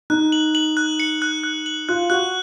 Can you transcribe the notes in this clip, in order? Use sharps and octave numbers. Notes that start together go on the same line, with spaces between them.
D#4 F#6
F#7
F#7
F#6
C#7
F#6
F#6
F#7
F4 F#6
F#4 F#6